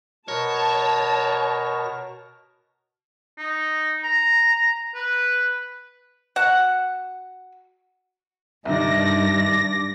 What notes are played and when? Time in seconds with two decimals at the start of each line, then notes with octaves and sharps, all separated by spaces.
0.28 B2 A#4 C#5 A5 A#6
3.38 D#4
4.04 A#5
4.95 B4
6.36 F#4 F#5
8.65 C2 G2 D#3 D5 A#6